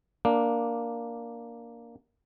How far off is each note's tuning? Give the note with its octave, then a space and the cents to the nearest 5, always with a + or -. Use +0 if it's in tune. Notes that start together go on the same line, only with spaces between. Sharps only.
A#3 +0 D4 +0